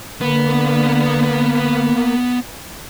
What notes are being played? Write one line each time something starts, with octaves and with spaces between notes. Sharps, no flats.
D3 A#3 B3 B4